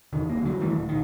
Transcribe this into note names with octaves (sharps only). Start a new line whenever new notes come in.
E2 D3 D#3
D1 A#3
D3 F#3
D#3 E3 F#3 A3
D#1
A#1 D#3